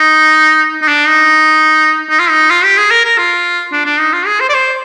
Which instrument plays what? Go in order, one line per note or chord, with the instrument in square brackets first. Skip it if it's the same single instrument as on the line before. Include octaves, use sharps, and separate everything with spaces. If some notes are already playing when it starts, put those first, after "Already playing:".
Already playing: [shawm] D#4
D#4
D4
D#4
D#4
F4
D#4
F4
G4
G#4
A#4
A#4
F4
D4
D4
D#4
F4
G#4
C5
D5
C5